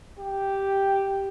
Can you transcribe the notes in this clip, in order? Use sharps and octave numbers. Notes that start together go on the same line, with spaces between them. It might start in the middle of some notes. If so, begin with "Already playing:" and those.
G4